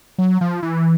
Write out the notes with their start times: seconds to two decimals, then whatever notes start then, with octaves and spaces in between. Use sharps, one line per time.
0.18 F#3
0.41 F3
0.63 E3